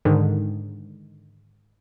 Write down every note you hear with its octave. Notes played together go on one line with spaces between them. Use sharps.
G#2 D3 D#3